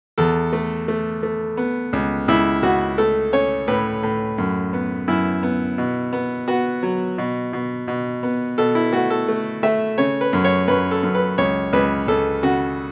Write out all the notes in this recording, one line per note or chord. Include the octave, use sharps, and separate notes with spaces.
E2 A4
A3
A3
A3
B3
C#2
C#2 E4
C#2 F#4
A3 A4
C#4 C#5
A2 B4
A2
F#2
B3
F#2 E4
B3
B2
B3
B3 F#4
F#3
B2
B2
B2
B3
B2 A4
E4
A3 F#4
A4
A3
A3 E5
C#3 C#5
B4
F#2
C#5
F#2 B4
A4
F#2
B4
C#2 C#5
C#2 B4
C#2 A4
C#3 F#4